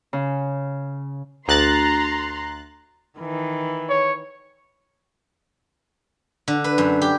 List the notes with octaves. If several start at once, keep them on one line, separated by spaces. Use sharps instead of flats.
C#3
D2 A#5 C6 F#6 A6
D#3 E3
C#5
D3
B4
F#2
G4